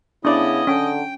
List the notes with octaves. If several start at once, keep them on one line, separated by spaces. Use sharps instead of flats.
C#3 B3 D4 E4 D5 D#5
D3 C#4 G5